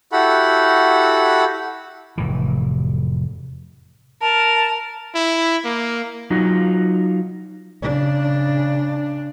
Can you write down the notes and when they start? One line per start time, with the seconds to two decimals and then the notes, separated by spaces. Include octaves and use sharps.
0.12 E4 F#4 G4 A4 F#5 B5
2.18 F1 A2 E3
4.21 A#4 A5
5.15 E4
5.65 A#3
6.30 F#3 D#4 F4 F#4
7.82 C#3 D4